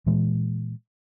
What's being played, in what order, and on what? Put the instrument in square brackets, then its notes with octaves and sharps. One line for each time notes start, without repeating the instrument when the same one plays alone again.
[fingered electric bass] A#2 E3 G#3